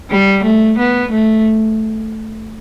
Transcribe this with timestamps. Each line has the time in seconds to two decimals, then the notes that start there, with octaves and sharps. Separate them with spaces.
0.10 G3
0.44 A3
0.79 B3
1.12 A3